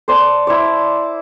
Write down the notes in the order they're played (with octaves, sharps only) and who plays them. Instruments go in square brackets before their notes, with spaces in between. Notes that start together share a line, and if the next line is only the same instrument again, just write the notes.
[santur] C5 D5 A5 C6
E4 C5 D5